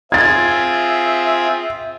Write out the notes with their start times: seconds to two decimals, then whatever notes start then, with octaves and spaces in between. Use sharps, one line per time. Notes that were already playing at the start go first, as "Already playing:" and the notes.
0.12 C4 F4 G#4 E5 G#6 A6